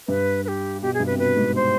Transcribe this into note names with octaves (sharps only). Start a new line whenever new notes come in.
G2 B4
B4
G4
B2 G4
G#4
G2
B4
C3
B2 B4
G#2
C5